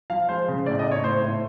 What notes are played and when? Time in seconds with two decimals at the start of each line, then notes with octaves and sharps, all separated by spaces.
0.10 F3 F5
0.29 G#3 C5
0.48 C#3
0.66 A2 D5
0.79 D#5
0.86 A2
0.92 C#5
1.04 A2 C5
1.23 A2